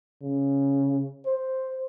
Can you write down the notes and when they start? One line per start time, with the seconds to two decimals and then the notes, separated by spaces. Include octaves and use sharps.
0.22 C#3
1.26 C5